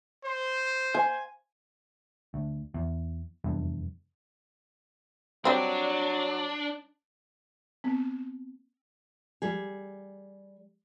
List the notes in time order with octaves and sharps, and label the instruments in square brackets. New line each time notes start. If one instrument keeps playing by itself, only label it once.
[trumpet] C5
[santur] G#5
[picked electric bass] D2
E2
F1 E2 G2
[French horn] F#3 [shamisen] G3 C4 [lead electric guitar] D4
[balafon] B3 C4
[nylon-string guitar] G3 G#4